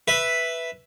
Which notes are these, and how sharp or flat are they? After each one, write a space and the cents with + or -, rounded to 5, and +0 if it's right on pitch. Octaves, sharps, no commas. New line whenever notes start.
B4 +0 E5 +0